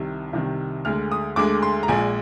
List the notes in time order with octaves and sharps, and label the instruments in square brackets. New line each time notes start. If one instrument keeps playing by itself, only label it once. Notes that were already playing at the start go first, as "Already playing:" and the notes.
Already playing: [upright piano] C2 C3 D#3
C2 C3 D#3
D2 D3 G#3 F6
D#6
D2 D3 G#3 D6
C6
A#5
A#1 A#2 G#3 G#5